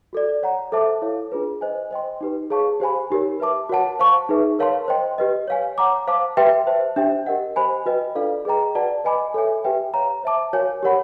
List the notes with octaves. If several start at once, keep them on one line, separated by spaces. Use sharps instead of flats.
F#4 A4 D5
C#5 F#5 A#5
A4 C5 E5 A5 D6
E4 A4 C#5 F5
D4 F4 G#4 B4
C5 D#5 G#5
C5 D#5 G5 C6
D#4 G4 B4
G#4 C#5 F5 A5 C#6
G4 C5 F5 G#5 B5
D#4 G4 A#4 C#5
B4 E5 A5 D6
F#4 A#4 C#5 F#5 A5
C5 F5 A5 C#6
D#4 G#4 B4 E5
A#4 C#5 F5 A5 C6
C5 D#5 G5 C6
G4 B4 D#5
C#5 F5 G#5
C#5 F#5 A#5 D6
C5 F5 A5 D6
G4 B4 E5 G5 C6
C5 E5 A5
D4 G4 C5 E5 G5
G4 A#4 D#5 F#5
G4 C5 D#5 G#5 B5
F#4 B4 D#5 G5
D4 F4 A4 D5 F5
G#4 B4 D#5 G5 A#5
F#4 B4 D5 F#5 A5
B4 D#5 G#5 B5 D6
A4 C#5 E5 G#5
G4 B4 E5 G5
C#5 F5 A#5
C5 E5 A5 D6
F#4 A#4 C#5 F5 G#5
G4 A#4 C#5 F#5 B5